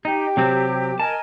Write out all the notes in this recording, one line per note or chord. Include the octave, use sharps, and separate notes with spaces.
D#4 G4
C3 F#3 C4
A#4 D#5 G#5 A5